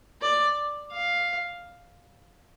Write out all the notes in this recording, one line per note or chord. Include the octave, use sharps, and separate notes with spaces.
D5
F5